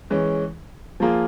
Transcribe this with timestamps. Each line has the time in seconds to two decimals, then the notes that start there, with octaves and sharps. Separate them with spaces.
0.10 E3 G#3 C#4
1.00 F3 A#3 F4 G#4